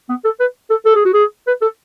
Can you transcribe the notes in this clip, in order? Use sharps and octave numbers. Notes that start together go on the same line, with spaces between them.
B3
A4
B4
A4
A4
G#4
F#4
G#4
B4
A4